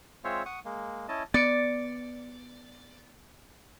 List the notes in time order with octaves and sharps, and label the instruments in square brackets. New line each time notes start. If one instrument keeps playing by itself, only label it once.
[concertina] G#3 C4 F4 C5 C#5 E5
F#5 C#6 D#6
G#3 A#3
C#4 E4 D#5 A5
[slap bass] B3 [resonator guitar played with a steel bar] D5 [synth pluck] A6 C#7 D7